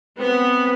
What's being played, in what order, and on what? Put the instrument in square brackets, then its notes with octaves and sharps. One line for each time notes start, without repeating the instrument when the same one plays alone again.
[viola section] B3 [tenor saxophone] C4